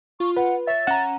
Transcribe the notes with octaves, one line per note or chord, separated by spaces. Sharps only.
F4 C#6
B4 F#5
C#5 E5 A6
C#4 F#5 A#5 E7